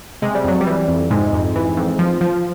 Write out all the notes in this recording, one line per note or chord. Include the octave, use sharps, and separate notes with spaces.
C3 G#3
G3
F2 F#3
G3
E3
F2
G#2 C3 G#3
F2
E3
F2
F3
F3